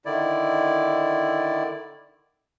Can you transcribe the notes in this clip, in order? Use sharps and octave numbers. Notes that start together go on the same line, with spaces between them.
D3 D#3 E4 D5